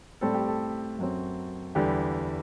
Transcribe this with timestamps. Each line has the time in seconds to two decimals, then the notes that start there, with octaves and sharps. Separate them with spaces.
0.21 A2 G3 C4 A4
0.34 G4
0.48 A4
0.98 F#2 F#3 C4
1.75 E2 D3 G3 B3 G4